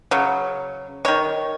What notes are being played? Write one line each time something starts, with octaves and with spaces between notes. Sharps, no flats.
C#3 F#3
D#3 G#3 C#5